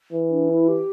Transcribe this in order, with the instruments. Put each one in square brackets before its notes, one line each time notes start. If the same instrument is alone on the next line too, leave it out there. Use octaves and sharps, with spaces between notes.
[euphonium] E3
[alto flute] D4
E4
G4